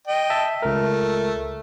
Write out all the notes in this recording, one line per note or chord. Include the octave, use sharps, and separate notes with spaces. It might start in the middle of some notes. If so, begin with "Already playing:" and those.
D#5 G5
E5 A5
C#2 A3 A#4